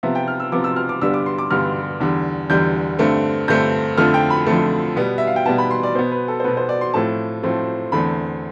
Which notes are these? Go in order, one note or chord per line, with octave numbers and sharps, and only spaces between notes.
C3 F3 B3 E5
G5
F6
E6
C3 F3 B3 D6
E6
F6
D6
G2 D3 G3 B3 E6
D6
C6
D6
G2 D3 G3 B3 F6
E2 D3 G3
E2 D3 G3 G6
G2 D3 A3 C4
G2 D3 A3 C4 G6
F2 D3 F3 A3 F6
G5
B5
F2 D3 F3 A3
B2 G3 B3
E5
F5
G5
B2 G3 B3 A5
B5
C6
D5
B2 B3 C5
B4
A4
C5
B2 B3 B4
C5
D5
C6
A2 F3 A3 C4 A5
A2 F3 A3 C4
E2 D3 A3 C4 B5